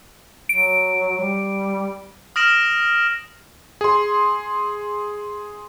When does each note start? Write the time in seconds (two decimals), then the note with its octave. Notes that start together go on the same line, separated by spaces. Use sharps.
0.49 F#3 D7
1.20 G3
2.36 D#6 F6 A#6 D7 E7 F#7
3.81 G#4 C6